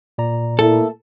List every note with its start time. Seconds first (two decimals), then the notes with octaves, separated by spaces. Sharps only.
0.18 A#2 D5 A#5
0.59 A3 A#3 E4 A4